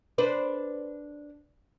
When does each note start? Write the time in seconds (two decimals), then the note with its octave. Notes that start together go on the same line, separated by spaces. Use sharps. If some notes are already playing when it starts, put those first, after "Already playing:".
0.18 D4 B4 C5